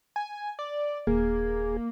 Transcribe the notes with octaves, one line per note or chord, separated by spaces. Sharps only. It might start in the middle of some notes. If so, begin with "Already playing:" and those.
G#5
D5
D#1 A#3 G#4